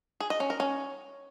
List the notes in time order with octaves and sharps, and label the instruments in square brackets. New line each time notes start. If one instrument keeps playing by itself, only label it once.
[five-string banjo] G#4
D#5
C#4
A#4
C#4